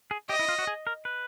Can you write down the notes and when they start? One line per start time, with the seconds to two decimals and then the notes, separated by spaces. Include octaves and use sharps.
0.11 G#4
0.29 G4 D#5
0.39 E4
0.49 F4
0.59 F#4
0.67 G#4
0.87 A#4
1.05 B4